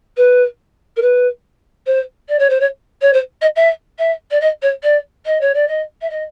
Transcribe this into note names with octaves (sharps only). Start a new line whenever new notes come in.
B4
A#4
B4
C5
D5
C#5
C5
C#5
C#5
C5
D#5
E5
E5
D5
D#5
C#5
D5
D#5
C#5
D5
D#5
E5
D#5